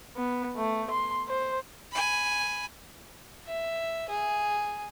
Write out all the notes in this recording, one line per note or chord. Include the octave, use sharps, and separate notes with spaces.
B3
A3
C6
C5
G#5 B5
E5
G#4